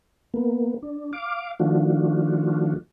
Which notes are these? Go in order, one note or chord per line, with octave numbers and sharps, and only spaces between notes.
A#3 B3
D4
F5 D6
D#3 F3 A3 D4 F4 F#4